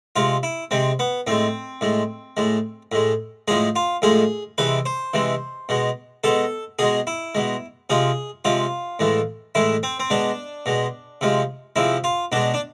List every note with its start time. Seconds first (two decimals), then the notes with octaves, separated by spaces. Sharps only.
0.16 C3 G#3 F4
0.43 E4
0.71 C3 G#3 C4
0.99 B3
1.27 A2 G#3 C4
1.81 A2 G#3
2.37 A2 G#3
2.92 A2 G#3
3.48 A2 F3 G#3 G#4
3.76 F4
4.02 A2 F3 G#3 G#4
4.58 C3 E3 G#3 B4
4.86 C5
5.14 C3 E3 G#3
5.69 B2 G#3
6.24 B2 G#3 A4
6.79 B2 G#3 G#4
7.07 E4
7.35 B2 G#3
7.90 C3 F3 G#3 G#4
8.45 C3 F3 G#3 F4
8.99 A2 E3 G#3
9.55 A2 E3 G#3 E4
9.83 C4
10.00 C4
10.10 B2 G#3 D4
10.66 B2 G#3
11.21 C3 F3 G#3
11.76 C3 F3 G#3 E4
12.04 F4
12.32 B2 G#3 D4
12.54 D4